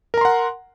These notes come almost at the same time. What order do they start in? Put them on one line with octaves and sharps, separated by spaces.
A#4 A#5 C6 F#5